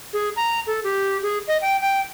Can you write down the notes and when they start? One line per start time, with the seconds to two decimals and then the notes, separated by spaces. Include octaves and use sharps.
0.13 G#4
0.36 A#5
0.67 A4
0.84 G4
1.23 G#4
1.48 D#5
1.62 G5
1.81 G5